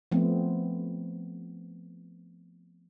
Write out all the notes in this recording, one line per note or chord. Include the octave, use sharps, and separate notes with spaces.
F3 A3 B3 C4